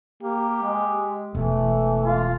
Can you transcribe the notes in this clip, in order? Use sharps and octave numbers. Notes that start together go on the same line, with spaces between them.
A#3 G4
G#3
E1 E3 A3
F4